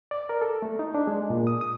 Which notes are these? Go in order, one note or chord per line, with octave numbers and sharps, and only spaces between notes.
D5
A#4
A4
A3
D#4
D4
G#3
A#2
D#6
D#6